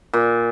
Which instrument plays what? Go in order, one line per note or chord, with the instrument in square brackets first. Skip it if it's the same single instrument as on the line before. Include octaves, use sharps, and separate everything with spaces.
[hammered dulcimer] A#2